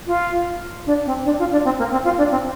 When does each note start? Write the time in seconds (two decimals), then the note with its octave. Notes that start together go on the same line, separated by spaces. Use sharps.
0.07 F4
0.86 D4
1.06 C4
1.25 D4
1.39 F4
1.52 D4
1.65 C4
1.79 A#3
1.92 C4
2.04 F4
2.18 D4
2.31 C4